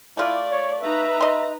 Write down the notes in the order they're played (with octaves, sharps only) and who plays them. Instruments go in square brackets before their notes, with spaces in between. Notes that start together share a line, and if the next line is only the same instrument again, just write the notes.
[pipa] A3 F4 [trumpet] E4 [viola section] D5
[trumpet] C#5
[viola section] D#4 B4 A#5 [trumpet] E5
[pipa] D#5 C6